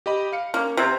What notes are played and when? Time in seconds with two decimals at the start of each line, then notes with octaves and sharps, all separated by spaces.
0.06 G4 D#5 B5
0.32 F5 C#7
0.54 A#3 C#4
0.77 C3 A#5 E6 G#6